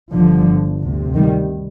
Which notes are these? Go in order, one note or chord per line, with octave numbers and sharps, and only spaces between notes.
G1 G2 D3 F3
D2 C3
D#3 G3